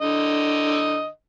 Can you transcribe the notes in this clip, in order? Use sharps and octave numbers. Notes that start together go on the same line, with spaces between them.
D3 D#5